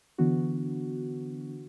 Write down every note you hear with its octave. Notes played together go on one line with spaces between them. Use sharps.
D3 E3 B3 D4 F#4